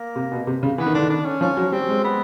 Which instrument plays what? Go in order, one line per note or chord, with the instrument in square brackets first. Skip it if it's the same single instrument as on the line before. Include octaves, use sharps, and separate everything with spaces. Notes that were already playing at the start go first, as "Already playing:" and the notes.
Already playing: [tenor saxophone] A#3
[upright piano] C3
B2
C3
C#3
[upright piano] E3 [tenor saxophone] B3
[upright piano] D#3
[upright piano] D3 [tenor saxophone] D4
[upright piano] D#3
[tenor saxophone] D4
C#4
[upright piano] F3 [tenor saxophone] C#4
[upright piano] F#3
[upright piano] G3 [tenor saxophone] C4
[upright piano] G#3
[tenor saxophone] B3